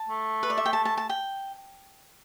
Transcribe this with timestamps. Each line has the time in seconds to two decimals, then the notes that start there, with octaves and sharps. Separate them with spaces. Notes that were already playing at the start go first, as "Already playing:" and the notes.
Already playing: A5
0.09 A3
0.43 B4
0.50 D5
0.57 E5
0.66 G5
0.73 A5
0.85 A5
0.97 A5
1.09 G5